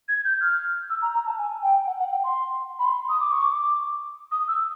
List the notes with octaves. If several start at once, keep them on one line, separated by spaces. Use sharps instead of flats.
G#6
G6
F6
E6
A#5
A#5
A5
G#5
G5
F#5
F#5
G5
C6
B5
C6
D#6
D6
C#6
D6
D#6
E6